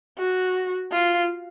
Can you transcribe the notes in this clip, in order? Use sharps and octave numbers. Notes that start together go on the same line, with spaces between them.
F#4
F4